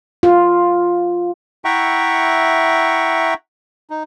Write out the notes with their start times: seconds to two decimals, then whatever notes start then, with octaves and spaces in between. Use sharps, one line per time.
0.23 F4
1.65 E4 E5 F#5 G5 A#5 C#6
3.90 D#4